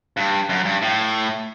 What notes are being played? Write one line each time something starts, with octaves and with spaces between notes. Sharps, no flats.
G2
F#2
G2
A2